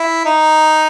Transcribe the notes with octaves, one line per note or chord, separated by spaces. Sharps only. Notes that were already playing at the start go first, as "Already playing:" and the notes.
Already playing: E4
D#4